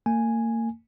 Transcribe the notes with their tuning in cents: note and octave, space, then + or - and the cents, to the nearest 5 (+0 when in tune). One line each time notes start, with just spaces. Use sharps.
A#3 -40 G#5 +0